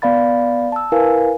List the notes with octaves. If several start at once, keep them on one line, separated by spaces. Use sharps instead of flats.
B3 D5 F5 B5 A6
A5 E6
E4 A#4 B4 F5 G#5